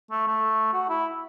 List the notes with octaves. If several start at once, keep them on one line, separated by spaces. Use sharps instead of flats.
A3
A3
F#4
E4